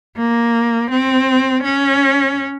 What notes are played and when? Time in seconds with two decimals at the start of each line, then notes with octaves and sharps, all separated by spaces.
0.18 A#3
0.91 C4
1.64 C#4